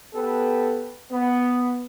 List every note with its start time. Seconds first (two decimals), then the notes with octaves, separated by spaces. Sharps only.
0.14 B3 G4 A4 B4
1.10 B3